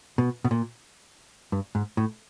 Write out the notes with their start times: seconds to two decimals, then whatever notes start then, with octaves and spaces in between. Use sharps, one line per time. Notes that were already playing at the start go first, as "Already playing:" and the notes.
0.18 B2
0.45 B2
0.51 A#2
1.52 G2
1.75 G#2
1.97 A2